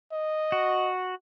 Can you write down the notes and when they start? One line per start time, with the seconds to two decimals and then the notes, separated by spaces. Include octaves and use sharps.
0.12 D#5
0.52 F#4